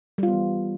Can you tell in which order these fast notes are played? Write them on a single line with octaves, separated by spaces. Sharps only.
G3 F4 B3 E3